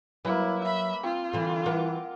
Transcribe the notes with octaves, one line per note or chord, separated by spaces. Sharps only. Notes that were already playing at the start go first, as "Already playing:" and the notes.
F#3 A#3 E4 B4
E5 B5
C4 F4
D3 E3
E3 A#4 F#5 D6